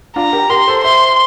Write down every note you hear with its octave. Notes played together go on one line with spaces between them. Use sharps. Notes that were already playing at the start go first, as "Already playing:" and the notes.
D4 F4 A#5
G4 A#4
G4 A#4 C6
A4 C5
C5 E5 C6